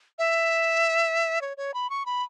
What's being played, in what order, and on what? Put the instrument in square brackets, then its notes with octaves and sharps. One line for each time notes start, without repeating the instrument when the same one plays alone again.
[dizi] E5
C#5
C#5
B5
C#6
B5